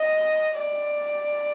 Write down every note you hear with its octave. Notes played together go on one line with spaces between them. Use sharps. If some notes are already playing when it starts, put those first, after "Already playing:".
Already playing: D#5
D5